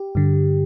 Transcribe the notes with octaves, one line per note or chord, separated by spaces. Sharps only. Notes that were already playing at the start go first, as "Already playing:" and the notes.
Already playing: G4
G2 D3